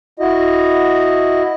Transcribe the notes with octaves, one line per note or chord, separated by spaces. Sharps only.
E4 F#4 D#5